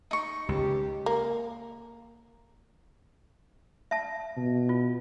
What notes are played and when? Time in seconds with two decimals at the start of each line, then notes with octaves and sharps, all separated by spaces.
0.11 D#4 C#6
0.49 C#2 G4
1.06 A#3
3.91 E5 A5
4.37 B2
4.69 F4